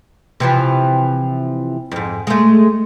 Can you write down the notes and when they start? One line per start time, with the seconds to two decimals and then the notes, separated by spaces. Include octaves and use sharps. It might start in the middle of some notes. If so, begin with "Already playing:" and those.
0.40 C3 E3 F3
1.91 F2 G#2
2.27 G#3 A3